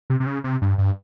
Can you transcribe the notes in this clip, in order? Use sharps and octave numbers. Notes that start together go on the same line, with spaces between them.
C3
C3
C#3
C3
G2
G2